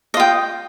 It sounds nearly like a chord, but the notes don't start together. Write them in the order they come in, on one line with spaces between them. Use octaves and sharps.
D#5 F4 G5